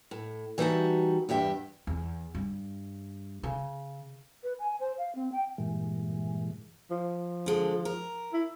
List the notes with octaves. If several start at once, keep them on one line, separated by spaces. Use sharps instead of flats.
A2
E3 G3 D#4 F#4 E5 A5
E2 G2 G4 E5
E2
G2
C#3
B4
G#5
C5
F5
C4
G5
G2 A#2 E3 G#3
F3
D3 G#3
A#4
E4